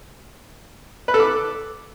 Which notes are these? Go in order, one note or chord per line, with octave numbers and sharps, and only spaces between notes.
B4
A4
D6